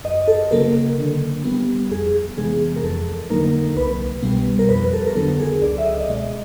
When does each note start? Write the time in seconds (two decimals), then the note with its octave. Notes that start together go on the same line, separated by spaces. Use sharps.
0.04 F#2 D#5
0.28 A4
0.51 C#3 F#3 A#3 A#4
0.98 D3
1.44 G3 B3
1.91 F2 G#4
2.37 C3 E3 G#3 B3 G#4
2.76 A#4
2.83 F2 A4
3.30 D3 F#3 A#3 D#4 A#4
3.76 C2 B4
4.23 B2 G3 B3
4.59 A#4
4.69 F2 B4
4.93 A4
5.07 A#4
5.15 D3 F#3 B3 A4
5.40 G#4
5.62 C#2 D5
5.78 E5
5.85 D#5
6.00 D5
6.09 B2 G#3 D#5